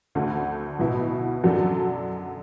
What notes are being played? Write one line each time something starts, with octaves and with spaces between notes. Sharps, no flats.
D2 D3 A3 F#4
B1 B2 B3 E4
F#2 F#3 D4 A4